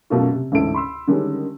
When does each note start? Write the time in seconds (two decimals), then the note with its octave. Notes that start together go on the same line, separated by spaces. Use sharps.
0.10 F#2 B2 A3 A#3 F4
0.32 C3
0.52 A1 D2 G#2 E4 A4 D7
0.74 B5 C6 E6
1.08 D3 D#3 G3 G#3 C#4